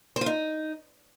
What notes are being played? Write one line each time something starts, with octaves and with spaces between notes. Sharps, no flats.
C5
F4
D#4